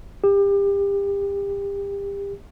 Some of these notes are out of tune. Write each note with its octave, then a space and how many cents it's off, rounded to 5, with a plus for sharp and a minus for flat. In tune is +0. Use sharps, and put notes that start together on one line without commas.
G4 +30